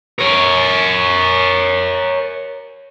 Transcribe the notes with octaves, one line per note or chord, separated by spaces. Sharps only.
A#4 C#5